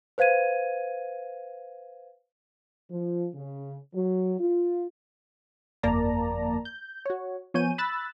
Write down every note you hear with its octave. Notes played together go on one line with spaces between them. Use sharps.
B4 C5 F5 G#6 D#7
F3
C#3
F#3
F4
G1 F2 A#3 D5 A5 A#5
G6
F#4 C#5
F3 B3 C#5 G#5 G6 D#7
B5 E6 F#6 A6